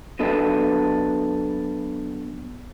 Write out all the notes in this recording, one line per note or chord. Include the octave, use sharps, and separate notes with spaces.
F#3 B3 D4 A4 D#5